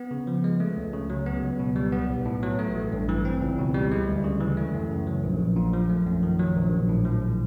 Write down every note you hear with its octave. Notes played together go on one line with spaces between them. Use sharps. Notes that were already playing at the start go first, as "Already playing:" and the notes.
Already playing: B3
C#3
F3
G#3
A3
C#2
C#3
F#3
B3
C#2
B2
G3
B3
B1
A2
F#3
A3
A1
G2
E3
C4
C#2
B2
G3
G#3
D2
C#3
E3
A3
F#2
C#3
F#3
A#1
A#1
A#2
F3
A3
F#2
D#3
F#3
A#1
A#1
A2
F3